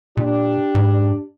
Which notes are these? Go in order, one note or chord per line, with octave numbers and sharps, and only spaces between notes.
A#2 D4 G4
G#2